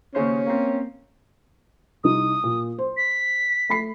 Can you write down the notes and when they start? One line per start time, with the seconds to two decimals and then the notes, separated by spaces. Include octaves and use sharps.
0.15 D#2 C#3 C#4 C5
0.46 A#3 C4
2.04 C2 D#4 D#6
2.44 A#2
2.78 C5
2.97 B6
3.69 A3 B5 C7